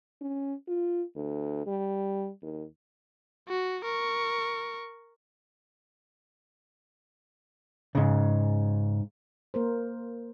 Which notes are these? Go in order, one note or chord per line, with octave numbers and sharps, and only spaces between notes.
C#4
F4
D2
G3
D#2
F#4
A#4 C#6
G#2 C#3
A#3 A#4 C5